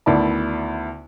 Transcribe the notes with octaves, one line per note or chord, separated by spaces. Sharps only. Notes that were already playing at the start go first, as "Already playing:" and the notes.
D2 D#3 B3 E4 D5 A5